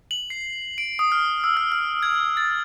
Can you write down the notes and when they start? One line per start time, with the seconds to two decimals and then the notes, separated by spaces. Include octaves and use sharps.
0.11 F#7
0.30 C7
0.78 D7
0.99 D#6
1.12 F6
1.44 E6
1.57 F6
1.72 F6
2.03 G#6
2.37 A6